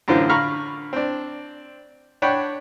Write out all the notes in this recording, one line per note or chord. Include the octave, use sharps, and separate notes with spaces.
F#2 A2 D3 E3 F4 C5
D3 F5 A#5 B5 C#6 F6
C4 D4
D4 C#5 F#5 G5 B5